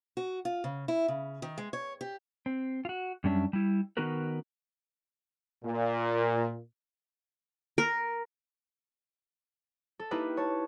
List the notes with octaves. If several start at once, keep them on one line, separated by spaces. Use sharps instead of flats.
F#4
F4
C#3
E4
C#3
D#3
G#3
C#5
G4
C4
F4 F#4
F#2 G3 C#4 D4 E5
G3 E4
D#3 B3 D#4 F#4 A#4 B4
A#2
A#4
A4
A#3 D#4 E4 G4 B4
C#5 A5